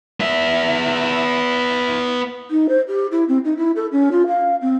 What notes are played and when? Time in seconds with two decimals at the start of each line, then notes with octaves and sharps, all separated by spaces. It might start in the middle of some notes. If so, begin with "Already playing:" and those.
0.20 B3 E5
2.50 D#4
2.68 C5
2.88 G4
3.11 E4
3.28 C4
3.44 D#4
3.56 E4
3.75 A4
3.91 C#4
4.11 F4
4.26 F5
4.61 C4